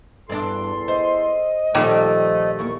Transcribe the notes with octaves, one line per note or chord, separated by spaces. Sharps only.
E2 G2 D4 A4 C6
C5 D#5
A#2 D#3 F3 G3 A3 A4 C#5
E2 A#3 C#6